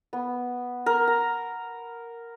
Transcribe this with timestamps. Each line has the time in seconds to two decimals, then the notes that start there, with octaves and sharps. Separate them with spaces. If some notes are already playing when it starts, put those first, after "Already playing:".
0.13 B3
0.86 A#4
1.08 A#5